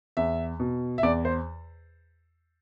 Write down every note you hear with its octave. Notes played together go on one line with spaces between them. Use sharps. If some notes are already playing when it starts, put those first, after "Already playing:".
E2 E5
B2
E5
E2 D5
C5